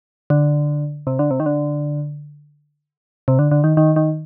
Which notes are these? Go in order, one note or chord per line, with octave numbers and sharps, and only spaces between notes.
D3
C3
D3
C3
D#3
D3
C3
D3
D3
D#3
D#3
D#3